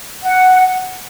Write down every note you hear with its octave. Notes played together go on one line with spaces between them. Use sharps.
F#5